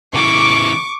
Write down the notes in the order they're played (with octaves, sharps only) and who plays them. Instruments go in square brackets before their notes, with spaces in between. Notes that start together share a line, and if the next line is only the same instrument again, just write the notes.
[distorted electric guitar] C#3 E3 [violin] C#6 [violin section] D6